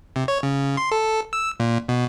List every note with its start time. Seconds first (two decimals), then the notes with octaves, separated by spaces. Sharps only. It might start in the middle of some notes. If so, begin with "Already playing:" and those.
0.16 C3
0.28 C#5
0.43 C#3
0.77 C6
0.92 A4
1.33 E6
1.60 A#2
1.89 B2